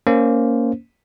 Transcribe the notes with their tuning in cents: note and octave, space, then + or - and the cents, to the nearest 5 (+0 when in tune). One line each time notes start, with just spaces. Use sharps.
A#3 +0 C#4 +15 C5 -5